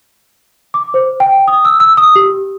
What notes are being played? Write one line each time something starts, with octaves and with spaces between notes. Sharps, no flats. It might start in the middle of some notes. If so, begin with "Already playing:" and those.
D6
C5
G5
D#6
E6
E6
D#6
G4